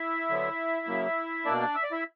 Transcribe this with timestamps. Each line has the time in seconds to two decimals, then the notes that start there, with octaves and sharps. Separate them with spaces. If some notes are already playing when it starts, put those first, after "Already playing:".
Already playing: E4 E5
0.29 D3 F#3 B3
0.87 C#3 F#3 A#3
1.45 B2 A#3 D4 D5
1.75 E5
1.83 D5
1.92 E4 E5